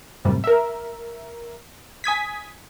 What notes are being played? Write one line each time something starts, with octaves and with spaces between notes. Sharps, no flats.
F#2 A2 C3 G3
A#4 E5
G#5 D#6 G#6 B6